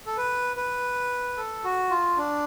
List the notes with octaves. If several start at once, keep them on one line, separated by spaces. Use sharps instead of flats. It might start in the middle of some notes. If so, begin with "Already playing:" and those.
A4
B4
B4
A4
F#4
F4
D4